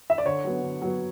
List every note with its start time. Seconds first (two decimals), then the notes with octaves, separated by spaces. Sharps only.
0.10 E5
0.18 D5
0.25 D3 C#5
0.44 F#3 B3
0.63 D3
0.82 F#3 B3